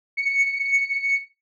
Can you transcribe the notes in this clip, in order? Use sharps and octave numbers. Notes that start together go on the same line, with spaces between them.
C#7